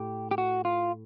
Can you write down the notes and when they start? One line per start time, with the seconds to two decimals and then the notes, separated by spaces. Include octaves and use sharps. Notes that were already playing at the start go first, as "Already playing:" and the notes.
Already playing: A2 G4
0.31 G4
0.38 F#4
0.65 F4